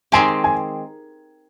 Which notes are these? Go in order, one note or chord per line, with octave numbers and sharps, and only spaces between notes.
D#3 G#3 C4 G4 G#5
G#5